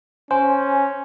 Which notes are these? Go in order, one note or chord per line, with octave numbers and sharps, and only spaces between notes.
C#4 C5 G#5